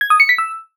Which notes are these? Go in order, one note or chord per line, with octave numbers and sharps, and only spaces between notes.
G#6
D#6
C#7
B6
E6